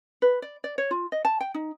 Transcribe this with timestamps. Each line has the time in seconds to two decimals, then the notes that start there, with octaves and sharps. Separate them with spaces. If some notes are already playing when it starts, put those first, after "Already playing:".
0.22 B4
0.42 D5
0.64 D5
0.78 C#5
0.91 F4
1.12 D#5
1.25 A5
1.41 G5
1.54 D#4